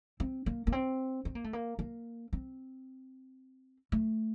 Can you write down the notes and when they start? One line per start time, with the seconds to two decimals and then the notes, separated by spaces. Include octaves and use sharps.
0.20 C4
0.46 A#3
0.67 A#3
0.72 C4
1.25 C4
1.35 A#3
1.44 A3
1.53 A#3
1.79 A#3
2.33 C4
3.92 A3